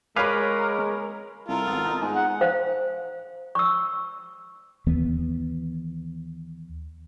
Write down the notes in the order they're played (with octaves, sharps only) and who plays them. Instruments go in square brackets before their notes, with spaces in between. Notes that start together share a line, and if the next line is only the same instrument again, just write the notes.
[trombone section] G#3 [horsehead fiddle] A#4 [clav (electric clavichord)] B4 F5 G#5 [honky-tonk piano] C#5 B5 D6
[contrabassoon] C2 [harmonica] F4 A4 A#4
[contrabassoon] G#1 [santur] B3
[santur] D#4 F#5
[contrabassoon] G#2 [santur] G#3 D#6
[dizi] F#5
[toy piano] C5 F5
C#6 E6
[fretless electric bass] D#2 E3 B3